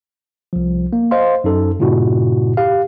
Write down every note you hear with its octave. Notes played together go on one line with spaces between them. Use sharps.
C2 F3
A#3
C5 D#5 F5 C6
F#2 D#4 A4
G2 A#2 C#3 E4 F#4
G4 F5